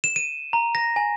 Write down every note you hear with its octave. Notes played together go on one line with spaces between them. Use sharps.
E7
D#7
A#5
A#6
G#5